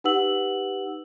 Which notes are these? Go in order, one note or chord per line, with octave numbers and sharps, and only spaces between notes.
D#4 G4 B4 F#5 E6 F#7